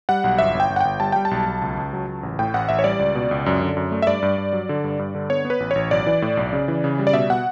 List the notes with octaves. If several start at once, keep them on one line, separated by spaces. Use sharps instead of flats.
G3 F#5
B1
G1 E5
G1
G5
G1
F#5
G1 G5
G3 A5
G3 G5
A5
B1
B1
C#2
C#2
F#3
C#2
A1
A2 G5
A1 F#5
A1 E5
C#5
G3 D5
C#2
B2
C#2
F#2
D3
F#2
A3
E5
G2 D5
G2
G2
F#3
D3
G2
G2
D3
B3 C#5
B3
B4
A1
A1 C#5
B1 D5
E3
A2
B1
C#3
E3
C#3
G3
D5
B2 E5
B2 F#5